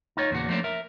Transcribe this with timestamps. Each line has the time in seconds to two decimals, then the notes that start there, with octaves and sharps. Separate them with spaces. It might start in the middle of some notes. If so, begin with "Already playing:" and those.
0.17 D#4 F4 C#5
0.31 E2 A#2 C#3 F#4
0.49 F3 A3 A#3 C#4 D4
0.64 A#4 E5